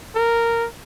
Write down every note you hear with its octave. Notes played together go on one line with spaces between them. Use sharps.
A#4